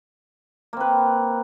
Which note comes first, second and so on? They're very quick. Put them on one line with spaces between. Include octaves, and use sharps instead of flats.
A#3 C4 B4